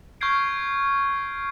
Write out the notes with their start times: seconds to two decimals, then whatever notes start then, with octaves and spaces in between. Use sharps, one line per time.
0.21 C#6 F6 G6 G#6 C7 D7